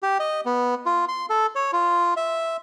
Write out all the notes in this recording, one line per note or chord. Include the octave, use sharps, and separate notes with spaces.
G4
D#5
B3
F4
C6
A4
C#5
F4
E5